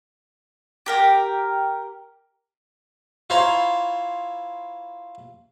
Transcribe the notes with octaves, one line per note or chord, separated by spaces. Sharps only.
G4 A#4 G5
E4 F4 C5 C#5 A#5 C6